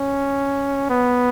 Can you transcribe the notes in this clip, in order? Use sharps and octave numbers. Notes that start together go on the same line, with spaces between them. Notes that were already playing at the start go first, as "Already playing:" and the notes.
Already playing: C#4
B3